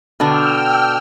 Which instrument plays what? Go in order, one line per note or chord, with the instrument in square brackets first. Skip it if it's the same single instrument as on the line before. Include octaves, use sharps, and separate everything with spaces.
[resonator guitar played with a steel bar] B2 D3 D4 [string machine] G5 E6 F6